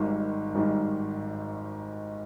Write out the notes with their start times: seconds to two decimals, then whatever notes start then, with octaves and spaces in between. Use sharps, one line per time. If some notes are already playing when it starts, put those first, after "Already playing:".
Already playing: G#1 G#2 D#3 G3
0.54 G#1 G#2 D#3 G3